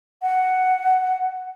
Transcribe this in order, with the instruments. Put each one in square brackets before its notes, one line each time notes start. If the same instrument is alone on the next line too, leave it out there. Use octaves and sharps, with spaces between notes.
[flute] F#5